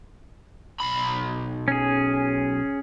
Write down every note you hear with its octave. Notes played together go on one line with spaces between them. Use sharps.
B1 B5
C#4 G#4